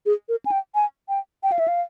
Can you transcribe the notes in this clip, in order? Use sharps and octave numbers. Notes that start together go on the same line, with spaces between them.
G#4
A#4
G#5
G5
G#5
G5
G5
F5
E5
F5